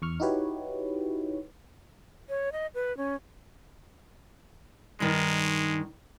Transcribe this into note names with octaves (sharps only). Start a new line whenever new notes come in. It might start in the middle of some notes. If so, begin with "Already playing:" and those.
E2 C#6 F6
D#4 E4 F#4 G4 B4 C#5
C#5
D#5
B4
C#4
G2 D#3 G#3